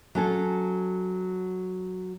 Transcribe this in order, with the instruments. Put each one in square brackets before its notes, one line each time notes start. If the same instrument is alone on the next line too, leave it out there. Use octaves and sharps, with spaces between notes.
[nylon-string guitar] F#3 C#4 A4